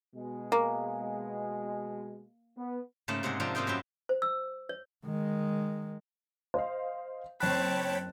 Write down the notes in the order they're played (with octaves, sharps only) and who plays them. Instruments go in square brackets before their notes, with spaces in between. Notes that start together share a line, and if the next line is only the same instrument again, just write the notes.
[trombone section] B2 G#3
[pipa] A#3
[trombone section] B3
[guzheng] G#2 C#3 A3 A#3 A5
G#2 C3 G#3 F#5 G#5
C3 F3 D4 F4 A#5
G#2 F3 A#3 C4 D#4 G5
F#2 F#3 B3 F4 G4 E5
[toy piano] C5
E6
C#5
[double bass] D#3 G#3
[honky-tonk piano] C5 D#5 F5
[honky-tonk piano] F#1 B6 [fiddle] C4 A5 [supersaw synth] C#5 G5 B5 [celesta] F#6